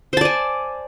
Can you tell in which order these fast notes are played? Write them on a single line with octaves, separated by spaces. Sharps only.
C5 A5 D5 G#5